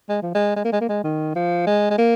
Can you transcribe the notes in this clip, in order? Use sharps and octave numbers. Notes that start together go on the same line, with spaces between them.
G#3
F3
G#3
G#3
A#3
G#3
A#3
G#3
D#3
F3
G#3
G#3
A#3